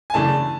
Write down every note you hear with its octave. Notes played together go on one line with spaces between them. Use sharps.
G#5
F#2 C#3 E3 A3 D4 A5